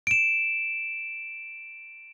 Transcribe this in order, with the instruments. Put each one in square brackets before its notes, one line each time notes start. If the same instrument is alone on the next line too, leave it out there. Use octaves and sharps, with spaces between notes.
[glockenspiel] D7 E7